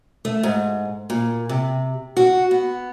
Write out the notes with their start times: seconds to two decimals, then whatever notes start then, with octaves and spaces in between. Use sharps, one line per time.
0.25 A3
0.43 G#2
1.10 A#2
1.49 C3
2.17 F#4
2.51 B3